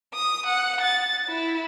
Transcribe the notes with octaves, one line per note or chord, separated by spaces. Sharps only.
D#6
F#5
A6
E4